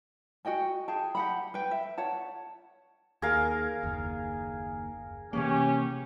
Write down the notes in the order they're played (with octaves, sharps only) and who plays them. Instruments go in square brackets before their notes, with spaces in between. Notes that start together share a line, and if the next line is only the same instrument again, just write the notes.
[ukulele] F#4 D#5 G5 G#5
G#4 G5 A5
G4 F#5 B5
B4 G5
E5
C#5 F#5 A5
[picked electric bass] D#2 [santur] G#4 A#4 F5
[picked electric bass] F#1 D#2
[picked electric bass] C3 E3 A#3 [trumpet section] C#4 G4